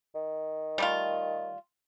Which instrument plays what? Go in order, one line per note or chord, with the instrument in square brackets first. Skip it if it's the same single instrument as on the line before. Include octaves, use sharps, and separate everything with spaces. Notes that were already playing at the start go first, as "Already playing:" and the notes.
[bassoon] D#3
[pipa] G3 A3 F4